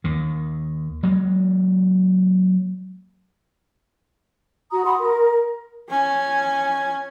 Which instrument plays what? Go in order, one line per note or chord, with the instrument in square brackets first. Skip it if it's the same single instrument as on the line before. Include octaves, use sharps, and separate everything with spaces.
[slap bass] D#2 D#3
F#3 G#3 A#3
[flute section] F#4 A#5 D#6
F#5 B5 C6 D#6
A#4
[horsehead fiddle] C#4 G#5